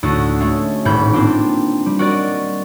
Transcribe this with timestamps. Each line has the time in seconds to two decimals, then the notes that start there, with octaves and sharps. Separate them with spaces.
0.03 D2 A2 F#4 A4 D#6
0.40 G#3 A3 C#4
0.85 D#1 G#1 A2 B5 G6
1.13 A#3 C4 D4 F4 G4
1.86 G3
1.99 F#4 A#4 D5 D#5